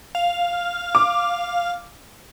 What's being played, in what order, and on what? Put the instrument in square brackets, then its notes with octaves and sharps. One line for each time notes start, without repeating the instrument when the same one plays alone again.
[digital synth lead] F5
[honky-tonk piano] D6